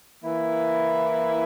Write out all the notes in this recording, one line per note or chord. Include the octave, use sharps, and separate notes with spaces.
E3 A#3 E4